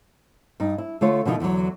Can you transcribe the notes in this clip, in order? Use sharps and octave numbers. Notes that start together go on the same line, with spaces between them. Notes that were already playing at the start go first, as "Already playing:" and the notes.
G2 D#4
E4
D3 A3 F4 C#5
B2 D3 D#3 F3 D#4 E4
E2 D3 D#3 F#3